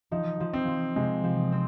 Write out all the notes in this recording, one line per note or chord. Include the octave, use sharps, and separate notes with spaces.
F3 D#4
F3
C4
F3
C3 G#3
F3
C4